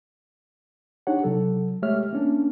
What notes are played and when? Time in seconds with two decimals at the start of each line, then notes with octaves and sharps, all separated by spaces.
1.07 D4 D#4 G4 C#5 F#5
1.23 C3 F#3 A4
1.82 G#3 A3 G4 C#5 E5 F6
2.13 A#3 C#4 D4